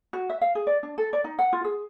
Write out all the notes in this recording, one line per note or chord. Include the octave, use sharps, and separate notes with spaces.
F#4
E5
F5
G#4
D5
D4
A4
D5
D#4
F#5
F4
G#4